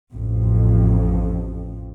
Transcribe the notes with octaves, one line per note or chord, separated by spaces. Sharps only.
A1 F2